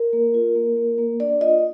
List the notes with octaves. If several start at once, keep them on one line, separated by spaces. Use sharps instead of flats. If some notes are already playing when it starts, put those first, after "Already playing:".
Already playing: A#4
A#3
F4
A#3
A#3
A#3
D4 D5
F4 D#5